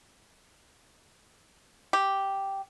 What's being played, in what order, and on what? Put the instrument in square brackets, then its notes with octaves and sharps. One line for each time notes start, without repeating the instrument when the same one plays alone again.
[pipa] G4